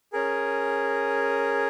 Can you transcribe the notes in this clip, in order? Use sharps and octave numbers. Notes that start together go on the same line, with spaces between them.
C#4 G#4 A#4